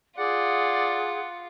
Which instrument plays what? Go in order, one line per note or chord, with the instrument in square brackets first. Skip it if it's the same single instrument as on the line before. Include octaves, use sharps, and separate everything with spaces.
[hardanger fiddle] F4 [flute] G#4 [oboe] D5 [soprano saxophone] F#5